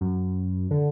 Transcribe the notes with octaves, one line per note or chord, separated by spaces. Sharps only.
F#2
D3